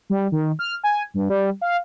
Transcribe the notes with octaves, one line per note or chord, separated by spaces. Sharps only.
G3
D#3
F6
G#5
G2
G3
F5